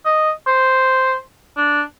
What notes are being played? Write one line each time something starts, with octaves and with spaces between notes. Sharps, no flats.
D#5
C5
D4